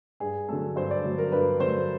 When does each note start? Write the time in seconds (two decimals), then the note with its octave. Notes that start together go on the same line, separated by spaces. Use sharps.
0.20 G2 G#4
0.48 D3 F#3 A3 A4
0.76 G2 C5
0.91 D5
1.04 D3 F#3 A3
1.18 A#4
1.32 G2 B4
1.60 D3 F#3 A3 C5